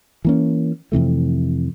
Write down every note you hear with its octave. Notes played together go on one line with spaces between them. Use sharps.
E3 A#3 C#4
F2 C3 E3 A3